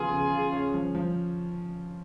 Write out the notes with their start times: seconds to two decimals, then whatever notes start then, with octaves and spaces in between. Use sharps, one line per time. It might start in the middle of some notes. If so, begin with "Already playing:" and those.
Already playing: C#3 F3 B3 F4 G#4
0.11 C#3
0.32 C#3
0.53 C#4
0.74 F3
0.95 F3